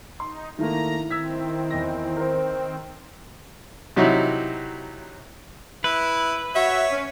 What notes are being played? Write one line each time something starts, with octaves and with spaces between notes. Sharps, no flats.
D#4 C6
D#3 A3 A#3 E4 A#5
D#3 C4 E6 G#6 B6
E2 D#5 A#6
A#4 C5
C3 F#3 D#4 E4 F#4
E4 B4
F#4 C#5 E5
C#4